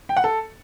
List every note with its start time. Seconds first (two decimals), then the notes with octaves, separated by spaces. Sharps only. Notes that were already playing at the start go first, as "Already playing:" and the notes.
0.09 G5
0.17 F#5
0.24 A4